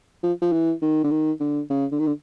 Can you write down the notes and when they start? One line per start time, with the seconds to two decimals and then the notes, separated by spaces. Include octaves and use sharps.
0.23 F3
0.42 F3
0.52 E3
0.82 D#3
1.04 D3
1.11 D#3
1.40 D3
1.70 C#3
1.92 D3
2.00 D#3
2.07 D3